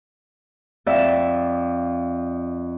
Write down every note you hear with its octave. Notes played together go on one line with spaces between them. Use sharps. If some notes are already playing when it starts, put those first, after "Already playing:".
F2 D5 E5